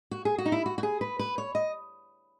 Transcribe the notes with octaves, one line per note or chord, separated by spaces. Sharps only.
F#4
G#4
F#4
D#4
E4
F#4
F#4
G#4
B4
B4
C#5
D#5